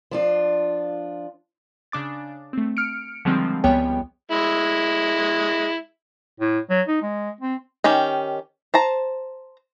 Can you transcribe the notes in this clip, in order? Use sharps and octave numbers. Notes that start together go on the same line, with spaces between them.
F3 D4 F4
C#3 D4 D6 A6
A3 C4
F6 C#7 D7
D3 D#3 F3 G3 G#3 C4
C#2 F3 G3 B3 C#5 G5
G#3 E4
A2
F#3
D#4
G#3
C4
D#3 C#4 G4
C5 A5 A#5